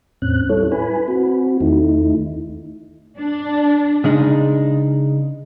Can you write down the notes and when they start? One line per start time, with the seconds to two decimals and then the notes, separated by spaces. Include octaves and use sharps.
0.22 E2 A2 C4 C#4 F#6
0.49 G3 C#4 E4 A4 C#5
0.72 E4 B4 G#5 B5
1.08 C4 F#4
1.60 E2 D#3 A3 D#4 E4
3.18 D4
4.04 C#3 G#3 D4 D#4